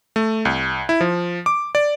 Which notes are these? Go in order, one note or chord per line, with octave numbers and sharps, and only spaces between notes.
A3
C2
E4
F3
D6
D5